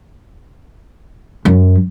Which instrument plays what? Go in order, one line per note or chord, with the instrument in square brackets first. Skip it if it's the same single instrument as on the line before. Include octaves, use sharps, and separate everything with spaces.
[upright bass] F#2